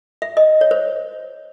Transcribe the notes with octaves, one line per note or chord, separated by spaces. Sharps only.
E5
D#5
C#5
C5